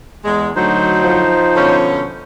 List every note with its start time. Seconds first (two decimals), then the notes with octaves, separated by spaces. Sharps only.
0.25 E2 G#3
0.56 D2 F#3 D#4 C5
1.04 F3
1.56 B2 D3 C#4